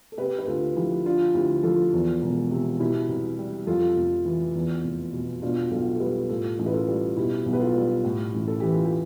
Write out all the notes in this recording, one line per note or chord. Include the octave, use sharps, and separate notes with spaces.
A4
C3 G4 B4
B4
D2 F4 A4
F3 E4 G4
D3 D4 F4
D2 E4 G4
F3 F4 A4
E2
E1
C3
B2 E4 G4
C2
G3
F2 F4 A4
F1
E3
E2
F1
B2
B2 D4 F4
B1 F4 A4
A4
G3 G4 B4
A2 F4 A4
A1
B4
F4 A4
G3
B2 E4 G4
B1
B4
F4 A4
G3
A2
A1
A4
E3 G4
F4 A4
G4